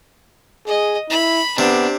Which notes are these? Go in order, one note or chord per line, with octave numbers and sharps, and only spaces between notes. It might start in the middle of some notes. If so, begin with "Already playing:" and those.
G#4 D#5
E4 B5
C3 B3 D4